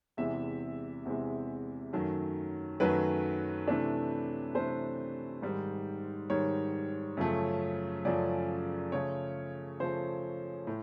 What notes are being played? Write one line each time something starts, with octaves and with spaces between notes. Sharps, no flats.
E2 C3 E3 G#3 E5
E2 C3 E3 G#3
F#2 D#3 F#3 A3
F#2 D#3 F#3 A3 B4
C3 E3 A3 D4
C3 E3 A3 D4 C5
G#2 D#3 G3
G#2 D#3 G3 C#5
F#2 C#3 F3 A3
F#2 C#3 F3 A3 D5
C#3 F3 A3 C#5
C#3 F3 A3 C5
A2